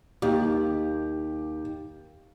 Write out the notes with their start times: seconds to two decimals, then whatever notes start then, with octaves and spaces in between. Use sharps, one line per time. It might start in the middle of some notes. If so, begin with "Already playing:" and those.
0.22 D#2 G4